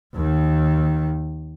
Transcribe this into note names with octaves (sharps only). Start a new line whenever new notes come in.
D#2 D#3